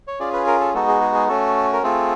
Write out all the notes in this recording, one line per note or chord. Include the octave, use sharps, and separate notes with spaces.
C#5
C#4 F4 G#4 D5
B4
A#4
A4
G#3 B3 D#4 F#4 A4
G#4
G#4
G#4
A3 C#4 F#4 A4
A#4
A3 C4 F4 G#4 A4